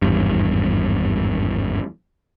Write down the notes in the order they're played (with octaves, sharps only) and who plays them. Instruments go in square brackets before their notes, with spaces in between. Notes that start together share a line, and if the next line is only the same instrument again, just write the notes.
[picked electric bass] G#1 E2 G2